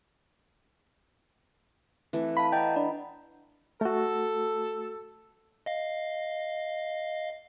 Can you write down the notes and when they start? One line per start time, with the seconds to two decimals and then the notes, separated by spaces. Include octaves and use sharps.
2.13 E3 A3 C4
2.37 F5 A5 B5
2.52 D5 D#5 F#5 G5 A#5
2.76 D4 B5
3.81 A3 F#4 A4
5.66 D#5 F5